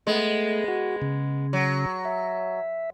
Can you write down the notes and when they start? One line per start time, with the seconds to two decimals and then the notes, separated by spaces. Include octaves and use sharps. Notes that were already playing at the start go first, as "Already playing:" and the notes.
0.07 G#3 A3 B3
0.68 F#4
1.02 C#3
1.53 F#3
2.05 E5